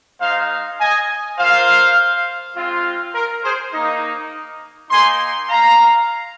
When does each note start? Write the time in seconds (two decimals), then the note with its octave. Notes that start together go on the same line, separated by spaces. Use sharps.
0.21 G#3 D#4 C5 F5
0.80 D#5 G#5
1.39 A#3 F4 C5 F5
2.56 G#3 C4 F4
3.15 A#4
3.44 G#4 C5
3.74 A#3 D#4
4.91 A#3 D#4 G#5 C6
5.50 F5 A#5